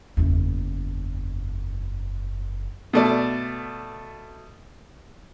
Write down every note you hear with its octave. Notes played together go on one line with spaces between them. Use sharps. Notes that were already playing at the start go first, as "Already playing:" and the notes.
F#1 E2
B2 A3 D5